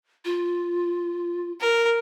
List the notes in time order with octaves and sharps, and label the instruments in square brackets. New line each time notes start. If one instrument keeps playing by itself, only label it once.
[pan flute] F4
[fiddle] A#4